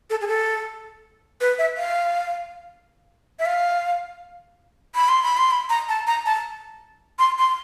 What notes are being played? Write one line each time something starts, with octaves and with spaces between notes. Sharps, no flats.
A4
G#4
A4
B4
E5
F5
E5
F5
B5
C6
B5
C6
B5
A#5
A5
A#5
A5
C6
C6